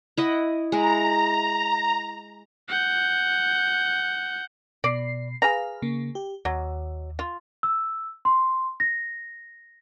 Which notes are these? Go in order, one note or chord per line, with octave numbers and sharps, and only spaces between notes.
E4 D#5 F#5
G#3 E4 A#5
F#5 G6
B2 D5 C7
G#4 B4 F5 A#5
C#3 A#3
G4
D#2 F#3
F4
E6
C6
A#6